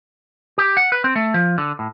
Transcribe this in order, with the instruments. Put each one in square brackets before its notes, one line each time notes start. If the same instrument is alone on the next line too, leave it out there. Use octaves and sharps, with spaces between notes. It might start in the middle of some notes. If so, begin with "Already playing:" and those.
[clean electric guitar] G4
F#5
B4
C4
A3
F3
D3
A2